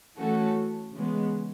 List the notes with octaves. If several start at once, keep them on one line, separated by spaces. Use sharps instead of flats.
E3 A3 C#4 F#4 A4
C#3 E3 G#3 B3